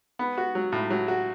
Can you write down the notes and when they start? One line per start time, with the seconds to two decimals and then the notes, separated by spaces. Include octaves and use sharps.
0.19 B3
0.38 F#4
0.55 F#3
0.72 A2
0.90 F#3
1.08 F#4